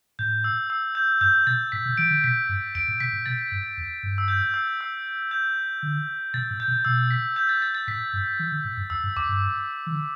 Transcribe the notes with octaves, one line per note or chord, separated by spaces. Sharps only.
A2 G6
E6
E6
G6
G2 G6
B2 A6
A2 B6
B2
E3 D7
D3
B2 B6
G2
E2 D7
A2
B2 B6
A2
B2 A6
G2
E2
G2
E6
G6
E6
E6
G6
D3
B2 A6
A2
G6
B2
B2 E6
B6
G6
A6
A6
A6
A2 B6
G2
E3
D3
A2
G2
E2 E6
G2
E2 D6
G2
E3
D3